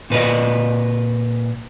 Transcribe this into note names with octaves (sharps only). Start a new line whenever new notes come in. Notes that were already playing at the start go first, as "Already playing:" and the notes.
A#2 B4 D5 D#5